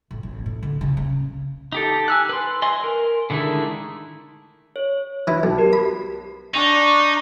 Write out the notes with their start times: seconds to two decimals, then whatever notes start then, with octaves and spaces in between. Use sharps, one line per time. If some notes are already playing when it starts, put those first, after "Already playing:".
0.11 A2
0.23 A1
0.46 A2
0.63 D3
0.81 C#3
0.97 C#4
1.72 D#4 G4 A4
2.08 G#5 E6 F#6
2.29 B4 C6
2.62 D#5 G#5 C6
2.84 A#4
3.30 D3 D#3 G#3 A3 E4
4.76 C#5
5.27 E3 E4
5.43 B1 A5
5.58 F#4 G4 A#4
5.73 B5
6.54 D4 D#4 C#6